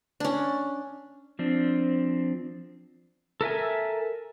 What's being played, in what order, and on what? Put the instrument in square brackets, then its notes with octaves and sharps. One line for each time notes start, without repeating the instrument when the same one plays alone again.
[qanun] C#4 D4
[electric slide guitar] F3 C4 D4
[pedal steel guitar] A4 A#4 E5 G#5